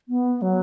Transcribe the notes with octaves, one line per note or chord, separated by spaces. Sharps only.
B3
F#3